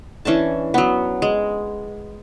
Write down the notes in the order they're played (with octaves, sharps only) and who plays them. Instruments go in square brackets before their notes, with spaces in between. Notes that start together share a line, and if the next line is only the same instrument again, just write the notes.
[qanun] E3 C#4 D4 A5
F#3 B3
G#3